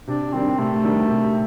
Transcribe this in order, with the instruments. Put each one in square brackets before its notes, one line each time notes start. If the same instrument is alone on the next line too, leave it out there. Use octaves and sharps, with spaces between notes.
[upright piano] C3 [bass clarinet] D4
[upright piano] D#3 G3 D4 [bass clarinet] C4
[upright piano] C3 [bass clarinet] A3
[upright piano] D#3 G3 D4
C3